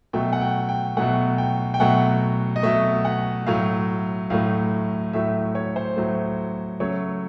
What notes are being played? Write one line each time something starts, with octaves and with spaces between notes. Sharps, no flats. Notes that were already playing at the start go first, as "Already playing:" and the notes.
B2 F#3 A3 G5
F#5
G5
G5
B2 F#3 A3 F#5
G5
G5
B2 F#3 A3 F#5
D#5
B2 F#3 A3 E5
F#5
A2 F#3 A3 F5
A2 F#3 A3 F5
A2 F#3 A3 E5
C#5
C5
A2 F#3 A3
C#3 F#3 A3 C#5